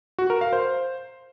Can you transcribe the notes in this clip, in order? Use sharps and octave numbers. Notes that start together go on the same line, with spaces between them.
F#4
A#4
F5
C5